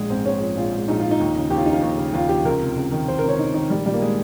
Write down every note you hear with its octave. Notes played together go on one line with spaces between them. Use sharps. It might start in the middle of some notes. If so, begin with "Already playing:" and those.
Already playing: A#1 G#3
G#2 C4
A#1 C#4
F3 C#4
A#1 F4
G#2
A#1 D#4
F3 F4
D#4
D#2
C#3
D#2 G4
F4
F3 D#4
F4
D#2
C#3
D#2 F4
F3 G4
C#2 A#4
C3
C#2
D#3
C#2 C5
A#4
C3 C#5
C#2 D#4
D#3 D#4
A#1 G3
A#2 G3
A#3
G#3